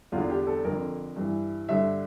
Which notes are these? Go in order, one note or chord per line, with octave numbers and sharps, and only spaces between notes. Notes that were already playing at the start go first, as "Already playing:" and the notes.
E2 D3 F4
G4
A4
F2 D3 A#4
G2 E3
G2 D3 E5